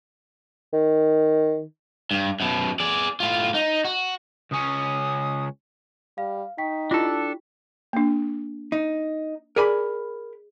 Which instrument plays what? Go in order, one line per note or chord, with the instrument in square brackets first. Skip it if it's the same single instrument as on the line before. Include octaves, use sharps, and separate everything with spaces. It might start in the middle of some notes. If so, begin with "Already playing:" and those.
[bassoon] D#3
[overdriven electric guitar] G2
F#2 B2
G#4 D5
A2 F4
D#4
F#4
[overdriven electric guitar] C#2 C#4 [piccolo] D#6
[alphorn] G3 [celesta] F5
[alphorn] D#4 [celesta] G5 C#6 B6
[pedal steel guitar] D4 A4 [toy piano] E4 F4 G4
[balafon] A#3 D4
[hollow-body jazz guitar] D#4
[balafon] G#4 D5 D6 [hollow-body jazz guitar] A#4 G#5 B5